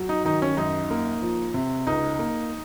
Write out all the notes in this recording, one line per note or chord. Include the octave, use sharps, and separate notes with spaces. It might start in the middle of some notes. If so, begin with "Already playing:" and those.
Already playing: F#3
D#4
D#3 D#4
C#4
F#2 D#4
A#3
F3
C3
C#2 D#4
A#3